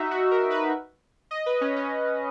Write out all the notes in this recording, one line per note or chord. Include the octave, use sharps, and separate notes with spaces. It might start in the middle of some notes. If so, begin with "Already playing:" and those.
Already playing: D#4 F#4 E5
F#4
A#4
B4
D#5
B4
C#4
C#4